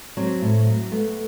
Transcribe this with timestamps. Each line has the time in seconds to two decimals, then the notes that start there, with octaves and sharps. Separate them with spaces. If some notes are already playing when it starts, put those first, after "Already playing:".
0.17 F#3 C4
0.41 A2
0.66 F#3
0.91 A3 B3